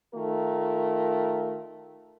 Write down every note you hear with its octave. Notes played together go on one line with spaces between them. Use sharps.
D#3 A3 F4 A#4